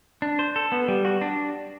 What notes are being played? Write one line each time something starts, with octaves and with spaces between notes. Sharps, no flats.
D4
C5
A4
B3
G3
F#4
D4